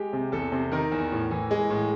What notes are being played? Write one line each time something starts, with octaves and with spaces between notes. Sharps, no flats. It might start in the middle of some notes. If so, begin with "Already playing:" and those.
Already playing: G#3 G4
C3
E2 A4
C3
D#3 A#4
E2
A2
E3
G#3
A2